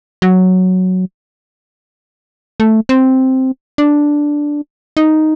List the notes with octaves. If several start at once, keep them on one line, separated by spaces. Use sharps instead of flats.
F#3
A3
C4
D4
D#4